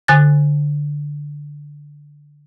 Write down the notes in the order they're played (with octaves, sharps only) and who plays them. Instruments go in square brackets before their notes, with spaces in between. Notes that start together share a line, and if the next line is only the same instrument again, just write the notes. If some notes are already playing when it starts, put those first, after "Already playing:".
[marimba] D3 G#5 F#6 A6